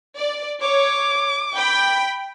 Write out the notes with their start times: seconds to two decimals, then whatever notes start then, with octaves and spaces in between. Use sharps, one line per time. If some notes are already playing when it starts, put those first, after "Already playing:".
0.17 D5
0.62 C#5 D6
1.56 G5 B5